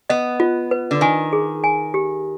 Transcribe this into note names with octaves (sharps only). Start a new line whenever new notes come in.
B3 D#5
F4
B4
D3
D#3 G#5
G#4
G#5
G4